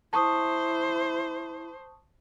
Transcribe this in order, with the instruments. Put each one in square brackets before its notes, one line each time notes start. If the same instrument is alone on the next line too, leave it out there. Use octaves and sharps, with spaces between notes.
[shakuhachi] E4 [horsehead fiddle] C5 [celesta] A5 C#6 D#6